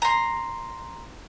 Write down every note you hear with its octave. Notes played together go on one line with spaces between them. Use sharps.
A#5 C6